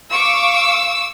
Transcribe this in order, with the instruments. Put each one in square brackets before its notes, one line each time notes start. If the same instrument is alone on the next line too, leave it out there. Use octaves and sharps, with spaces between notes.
[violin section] F5 C#6 D6 [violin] E6